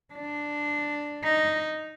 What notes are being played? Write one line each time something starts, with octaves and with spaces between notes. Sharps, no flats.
D4
D#4